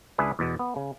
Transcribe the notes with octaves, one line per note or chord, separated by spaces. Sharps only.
C#2 D4 E4 G#4 B4
E2 B2
B3
C#3